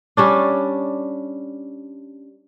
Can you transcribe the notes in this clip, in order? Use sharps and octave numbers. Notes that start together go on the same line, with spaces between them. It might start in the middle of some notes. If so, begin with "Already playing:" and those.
G3 C#4 D4